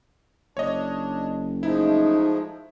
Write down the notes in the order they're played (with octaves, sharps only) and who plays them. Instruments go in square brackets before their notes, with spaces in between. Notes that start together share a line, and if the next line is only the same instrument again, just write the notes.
[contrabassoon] F#1 [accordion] D4 [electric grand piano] C#5 D#5
[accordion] F3 G#3 A3 [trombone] D#4 [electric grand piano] E4